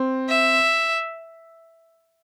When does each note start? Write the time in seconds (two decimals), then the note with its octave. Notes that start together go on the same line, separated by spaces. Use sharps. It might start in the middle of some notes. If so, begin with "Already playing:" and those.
Already playing: C4
0.29 E5